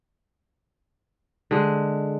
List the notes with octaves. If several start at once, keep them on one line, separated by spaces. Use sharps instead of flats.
D3 G#3